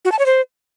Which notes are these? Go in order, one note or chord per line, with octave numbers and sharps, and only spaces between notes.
F#4
A5
C#5
C5